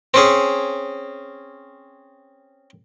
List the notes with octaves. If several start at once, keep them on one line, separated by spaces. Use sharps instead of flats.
C4 C#4 G#4